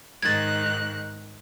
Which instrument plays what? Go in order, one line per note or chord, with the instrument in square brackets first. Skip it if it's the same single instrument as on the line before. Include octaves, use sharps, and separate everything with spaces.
[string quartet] G#2 D#3 F#6 [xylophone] G#6 A6